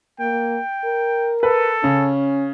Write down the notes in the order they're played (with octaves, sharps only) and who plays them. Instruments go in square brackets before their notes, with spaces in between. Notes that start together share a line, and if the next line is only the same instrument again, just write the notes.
[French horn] A#3 [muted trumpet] G5
[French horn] A#4
[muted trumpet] A4 [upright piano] B4
[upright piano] C#3 [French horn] C#4